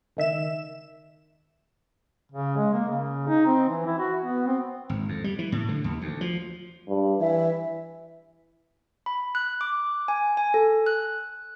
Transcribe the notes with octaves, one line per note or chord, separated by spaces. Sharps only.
C#2 D#3 E5 E7
C#3
G#3
A#3
C#3
D#4
C4
E3
E4
F#4
B3
C4
G#1
F2
G3
E3
A2
D3
D#2
D2
F3
G2
E3 E5
B5
F#6
D6
G#5
G#5
A4
F#6